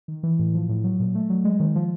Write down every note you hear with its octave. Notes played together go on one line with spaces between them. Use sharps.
D#3
E3
A2
F3
A2
F#3
A#2
A3
F#3
G#3
D#3
F3